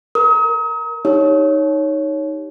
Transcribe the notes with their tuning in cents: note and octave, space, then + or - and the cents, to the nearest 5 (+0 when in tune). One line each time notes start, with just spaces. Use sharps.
A#4 +0 D#6 +40
D#4 +0 G4 +0 C#5 +0